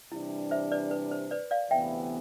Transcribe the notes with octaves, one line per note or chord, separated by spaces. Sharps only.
C3 E3 G3 D4 E4
C5 E5
B4 D5
B4
C5
B4 D5
D5 F5
D2 C3 E3 B3 E5 G5